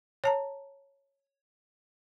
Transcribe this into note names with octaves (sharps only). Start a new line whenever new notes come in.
C#5 A5 A#5